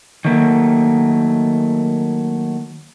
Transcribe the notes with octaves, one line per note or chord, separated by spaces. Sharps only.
D#3 F#3 A3 A#3